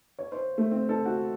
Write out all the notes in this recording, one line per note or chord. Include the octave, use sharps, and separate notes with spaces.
C#5
C5
A3
C4
A4
F#4